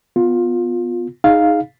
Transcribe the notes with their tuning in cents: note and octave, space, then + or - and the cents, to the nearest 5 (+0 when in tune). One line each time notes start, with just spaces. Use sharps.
B3 +10 F4 +15
D#4 +5 G#4 +0 F5 +0